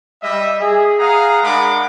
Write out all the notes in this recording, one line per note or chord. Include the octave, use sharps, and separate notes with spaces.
G3 D#5 E5
G#4
G#4 F5 F#5 A#5 D#6
G#3 D4 A#4 F#5 B5 D6